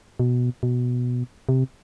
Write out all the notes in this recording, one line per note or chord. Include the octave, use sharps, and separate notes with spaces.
B2
B2
C3